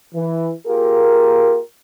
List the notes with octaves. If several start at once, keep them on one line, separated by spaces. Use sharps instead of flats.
E3
A#3 F4 G4 G#4 A#4